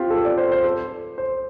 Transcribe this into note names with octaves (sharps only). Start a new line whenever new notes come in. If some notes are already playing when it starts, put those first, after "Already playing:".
Already playing: C4 F4 G4
A4
D5
C5
C5
A4
C5